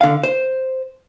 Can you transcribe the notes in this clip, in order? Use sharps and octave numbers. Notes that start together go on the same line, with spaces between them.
D3 F5
C5